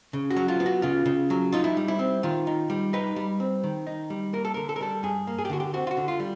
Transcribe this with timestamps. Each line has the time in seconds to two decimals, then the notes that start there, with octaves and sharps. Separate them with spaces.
0.13 C#3
0.30 F#4
0.36 F#3
0.48 F4
0.60 B3
0.66 F#4
0.82 C#3 F4
1.06 C#3
1.30 F#3
1.52 D#4 F4
1.64 E4
1.77 G3
1.88 E4
1.99 C4
2.23 D#3 F4
2.47 D#4
2.70 G3
2.93 D#4 B4
3.16 G3
3.40 C4
3.64 D#3
3.87 D#4
4.10 G3
4.33 A#3 A#4
4.45 A4
4.54 D3 A#4
4.69 A4
4.76 A#4
4.81 G3 A4
5.03 G2 G#4
5.27 A#3
5.38 G#4
5.45 G4
5.50 D3 F#4
5.60 G4
5.74 C4 F#4
5.87 F4
5.91 F#4
5.97 D3
6.08 F4
6.20 G3